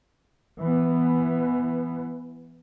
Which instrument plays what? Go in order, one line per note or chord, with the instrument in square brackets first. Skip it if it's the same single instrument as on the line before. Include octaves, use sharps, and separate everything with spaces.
[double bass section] E3 B3